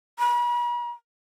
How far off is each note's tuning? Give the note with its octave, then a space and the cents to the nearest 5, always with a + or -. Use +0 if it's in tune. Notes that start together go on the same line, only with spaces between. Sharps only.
B5 -45